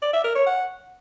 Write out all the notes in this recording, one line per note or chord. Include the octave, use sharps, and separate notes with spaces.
D5
E5
A#4
C#5
F#5